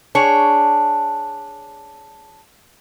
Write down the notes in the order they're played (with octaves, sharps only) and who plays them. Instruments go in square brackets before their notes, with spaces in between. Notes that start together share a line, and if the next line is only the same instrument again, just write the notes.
[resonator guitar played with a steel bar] D4 G#4 C#5